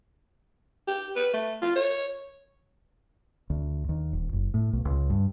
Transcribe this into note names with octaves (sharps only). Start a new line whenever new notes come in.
G4
B4
A3
F4
C#5
D2
D#2
D#1
F#1
A2
B1
C#2
G2